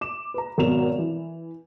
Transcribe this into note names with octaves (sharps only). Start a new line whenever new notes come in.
D6 E7
B4 A#5
G#1 B2 F#3 A#4 E7 F7
E3